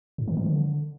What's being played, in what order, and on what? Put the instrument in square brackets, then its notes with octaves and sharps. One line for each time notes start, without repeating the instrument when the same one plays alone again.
[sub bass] G#2
D#3
E3
D3